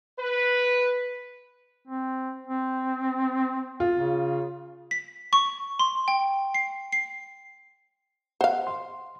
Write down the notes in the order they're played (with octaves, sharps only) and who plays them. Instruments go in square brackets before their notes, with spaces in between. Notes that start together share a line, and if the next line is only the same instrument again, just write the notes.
[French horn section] B4
[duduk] C4
C4
[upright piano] F4
[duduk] C#3
[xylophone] B6
C#6
C6
G5
C7
C7
[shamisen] C5 F5 [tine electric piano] D#5 F#5
[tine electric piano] C6